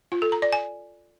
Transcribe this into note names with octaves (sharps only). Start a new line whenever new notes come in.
F4
A4
A#5
D5
G#5